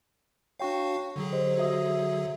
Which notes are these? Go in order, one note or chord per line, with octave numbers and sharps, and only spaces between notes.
D4 F#4 C#5 F5 G5 C#6
D3 F#3 G#4
G4 C5 D#5
F#4 E5 D#6